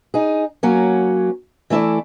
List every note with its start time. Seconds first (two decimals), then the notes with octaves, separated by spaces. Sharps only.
0.14 D#4 G#4
0.63 F#3 A#3 C#4
1.70 E3 A3 E4 A4 D5